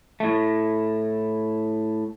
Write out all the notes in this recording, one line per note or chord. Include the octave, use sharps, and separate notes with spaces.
A2 A3